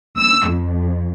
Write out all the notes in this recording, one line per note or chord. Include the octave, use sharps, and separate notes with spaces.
E6
F2